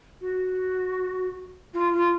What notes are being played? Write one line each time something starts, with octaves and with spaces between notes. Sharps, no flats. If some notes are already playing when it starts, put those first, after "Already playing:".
F#4
F4
F4